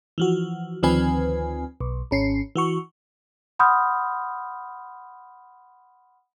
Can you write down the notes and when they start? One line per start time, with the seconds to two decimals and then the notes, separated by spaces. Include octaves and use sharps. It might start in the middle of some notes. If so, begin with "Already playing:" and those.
0.18 E3 F3 F#4
0.83 D2 D#3 F3 C4 B4 G#5
1.81 B1
2.11 G#1 C#4 C7
2.56 E3 F#4 C#6
3.59 F#5 B5 C6 D#6 F6 G6